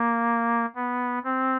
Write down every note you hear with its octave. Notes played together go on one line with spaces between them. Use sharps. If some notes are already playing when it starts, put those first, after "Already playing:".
Already playing: A#3
B3
C4